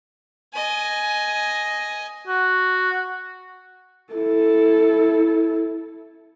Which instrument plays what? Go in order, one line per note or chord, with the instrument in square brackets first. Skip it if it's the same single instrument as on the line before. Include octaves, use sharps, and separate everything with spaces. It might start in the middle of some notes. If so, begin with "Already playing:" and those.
[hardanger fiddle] D#5 G#5
[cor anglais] F#4
[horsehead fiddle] E4 A4